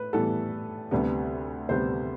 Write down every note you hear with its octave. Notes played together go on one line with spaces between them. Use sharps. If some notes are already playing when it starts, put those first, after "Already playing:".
Already playing: A2 B4
A2 E3 G3 B3 A4
D2 C3 G3 B3
D2 C3 G3 B3 C5